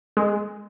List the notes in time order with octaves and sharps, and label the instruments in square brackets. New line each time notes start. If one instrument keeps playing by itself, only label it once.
[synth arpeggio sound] G#3